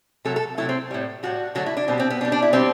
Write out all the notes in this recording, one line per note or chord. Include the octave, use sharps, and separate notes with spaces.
C3 F#3 A3 A4
A4
C3 F#3 A3 E4
C4
A2 G3
A2 G3 F#4
D3 F#3 A3 F#4
E4
D4
B2 G3 C4
C4
B3
B2 G3 D4
D4
E4
B2 G3 C4